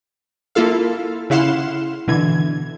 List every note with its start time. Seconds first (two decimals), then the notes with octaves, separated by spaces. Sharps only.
0.55 A#3 E4 F4 A4 F5
1.30 C#3 E4 F5 F#5 C6 E7
2.08 B2 D3 E3 G#6